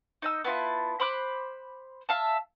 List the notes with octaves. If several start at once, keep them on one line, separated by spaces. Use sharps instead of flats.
D#4 D#5 E6
B3 E4 F4 A5
C5 B5 D6 F#6
E5 F5 A5